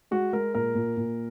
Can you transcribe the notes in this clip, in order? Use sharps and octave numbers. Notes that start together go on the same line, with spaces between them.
G#3 F#4
G#3 A#4
A#2 A#4
A#2
A#2